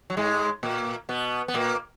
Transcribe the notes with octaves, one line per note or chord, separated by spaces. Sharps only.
F#3
G#2 G#3
A#2 A#3
B2 B3
B3
A#2 A#3